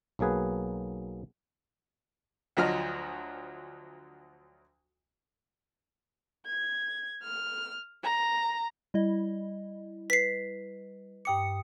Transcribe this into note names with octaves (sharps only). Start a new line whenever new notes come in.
B1 F#3 A#3 G#4 B4
D2 F3 F#3 D#5 F6
G#6
F6
A#5
G3 E4 D#5
B4 B6 C7
G2 G5 D6 D#6 C#7